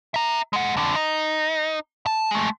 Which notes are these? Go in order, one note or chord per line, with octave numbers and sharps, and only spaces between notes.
E5 A#5
G#3 F#5
F2 D3
D#4
A5
G#3 A3